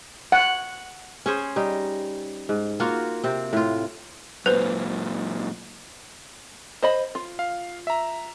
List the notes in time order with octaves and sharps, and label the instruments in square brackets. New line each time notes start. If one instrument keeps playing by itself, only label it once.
[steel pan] F#5
[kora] C#4 G#4 C5
G3 D#4
G#2
A#3 F4 F#4 F5
C3 C4
A2 F4
[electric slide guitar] F#2 A#2 [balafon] B4 C5
[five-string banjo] C5 D#5 B5
F4
[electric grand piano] F5
E5 A#5